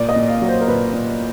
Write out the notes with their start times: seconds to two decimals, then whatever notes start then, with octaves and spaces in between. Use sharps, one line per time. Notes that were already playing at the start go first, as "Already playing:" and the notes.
Already playing: A#2 D5
0.09 D#5
0.16 A#2
0.28 F5
0.42 F#3
0.48 C5
0.61 A#4
0.68 A#2 B4
0.94 A#2